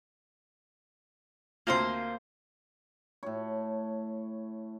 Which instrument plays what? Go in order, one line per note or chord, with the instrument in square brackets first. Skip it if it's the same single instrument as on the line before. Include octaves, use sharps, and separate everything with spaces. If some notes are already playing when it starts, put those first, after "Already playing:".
[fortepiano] D2 C4 F4 [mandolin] A#3 C5 C6
[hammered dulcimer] A2 C#5